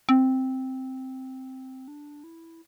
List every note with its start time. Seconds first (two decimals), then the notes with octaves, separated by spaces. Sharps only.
0.09 C4
1.88 D4
2.24 E4